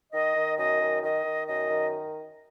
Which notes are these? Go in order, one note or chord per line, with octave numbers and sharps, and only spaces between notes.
D#3 D#5
D#3
F#2 D#5
D#3
D#3 D#5
D#3
F#2 D#5
D#3